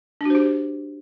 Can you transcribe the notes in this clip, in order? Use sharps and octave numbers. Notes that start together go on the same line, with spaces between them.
D4 F#4 G4 C5